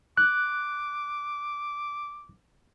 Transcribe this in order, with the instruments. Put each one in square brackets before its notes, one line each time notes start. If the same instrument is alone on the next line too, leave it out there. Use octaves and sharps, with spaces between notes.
[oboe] D6 [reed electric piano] F#6